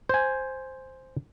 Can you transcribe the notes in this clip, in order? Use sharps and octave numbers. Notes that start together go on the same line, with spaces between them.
C5 G#5